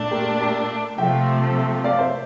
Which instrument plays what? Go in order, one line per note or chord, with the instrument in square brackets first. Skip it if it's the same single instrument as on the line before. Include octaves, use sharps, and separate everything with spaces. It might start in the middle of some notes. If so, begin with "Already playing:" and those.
Already playing: [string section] A#2 A3 D4
[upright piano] G4 A#4
G4 A#4
[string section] C3 F3 A3 [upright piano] E5 G5
[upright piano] D5 F5
C5 E5